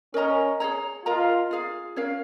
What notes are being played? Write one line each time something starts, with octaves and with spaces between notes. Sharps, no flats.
C#4 A#4 D#5 A#5
G#4 C#5 A#5
F4 A#4 D#5 A#5
F4 G#4 F5
C#4 A#4 C#5 F5